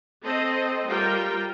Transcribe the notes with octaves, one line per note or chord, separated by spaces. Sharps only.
C4 A4 C5 D#5
G3 F4 A#4 G5